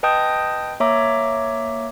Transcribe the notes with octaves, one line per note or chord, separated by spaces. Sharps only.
B4 D#5 G5 A5 D#6 G6
A#3 C#5 E5 A#5 D6